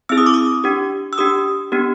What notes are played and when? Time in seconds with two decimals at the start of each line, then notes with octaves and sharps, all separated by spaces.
0.09 C4 E4 G#4 E6
0.18 D#6
0.26 D6
0.34 D#6
0.64 D4 G4
1.13 E6
1.18 D4 G4 D#6
1.72 B3 D4 G4